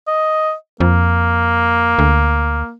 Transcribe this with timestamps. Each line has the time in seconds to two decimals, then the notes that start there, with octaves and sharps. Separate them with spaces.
0.07 D#5
0.80 F2 A#3
1.99 D2